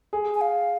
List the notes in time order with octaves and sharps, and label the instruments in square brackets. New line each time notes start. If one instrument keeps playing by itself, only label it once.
[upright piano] G#4
[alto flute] G#5
F5